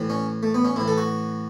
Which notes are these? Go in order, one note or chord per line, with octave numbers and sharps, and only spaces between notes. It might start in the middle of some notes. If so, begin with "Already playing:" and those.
Already playing: A2 E3
C#4
A3
B3
C#4
A2 E3 E4
A4
F#4